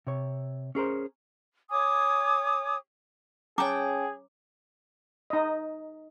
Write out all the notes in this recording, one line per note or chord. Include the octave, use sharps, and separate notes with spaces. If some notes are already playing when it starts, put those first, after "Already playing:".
C3 C#5
C#4 G#4 A#4 C5
C#5 G#5 D6 D#6
C#4 G#4 A4 C#5 F#5 G5 A#5 D6
D#4 D#5